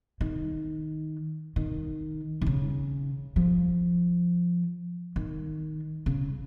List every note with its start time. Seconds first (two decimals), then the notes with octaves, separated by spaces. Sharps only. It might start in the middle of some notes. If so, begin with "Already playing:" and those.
0.21 D#3
1.56 D#3
2.41 D#3
2.46 C#3
3.36 F3
5.16 D#3
6.06 C#3